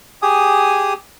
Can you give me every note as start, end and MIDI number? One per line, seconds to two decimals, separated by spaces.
0.22 0.94 67
0.22 0.94 68
0.22 0.94 80
0.22 0.94 87